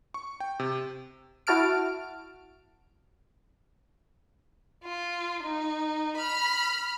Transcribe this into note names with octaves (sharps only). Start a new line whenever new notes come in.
C#6
G5
C3
E4 F#4 A5 F6 D7
F4
D#4
B5 F6